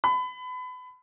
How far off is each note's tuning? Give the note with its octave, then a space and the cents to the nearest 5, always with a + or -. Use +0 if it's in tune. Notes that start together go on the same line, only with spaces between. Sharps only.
B5 +30